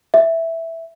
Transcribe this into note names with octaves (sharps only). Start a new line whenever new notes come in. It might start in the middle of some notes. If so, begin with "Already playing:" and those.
E5